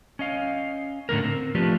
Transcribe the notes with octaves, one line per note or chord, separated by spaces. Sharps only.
C#4 D#5 F5
A2 D3 A#3 A#4
C4
F3 A3 D4 F4 G4 B4